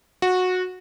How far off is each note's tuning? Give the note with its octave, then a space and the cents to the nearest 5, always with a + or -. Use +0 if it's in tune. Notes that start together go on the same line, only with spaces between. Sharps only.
F#4 -15